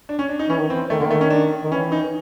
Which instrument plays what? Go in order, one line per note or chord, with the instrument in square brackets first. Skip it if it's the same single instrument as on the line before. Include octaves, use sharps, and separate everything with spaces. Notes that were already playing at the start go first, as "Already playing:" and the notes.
[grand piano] D4
C#4
D4
D#4
[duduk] E3 [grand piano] C#4
[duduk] D#3
[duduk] E3 [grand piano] C4
[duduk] D#3 [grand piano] A3
[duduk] D3 [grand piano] A#3
[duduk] D#3 [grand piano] A3
[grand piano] C#4
D4
[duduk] D#3
[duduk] E3 [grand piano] C#4
[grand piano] D#4